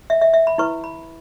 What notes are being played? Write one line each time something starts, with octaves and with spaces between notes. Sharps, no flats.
E5
E5
E5
B5
E4 B4 C#6
B5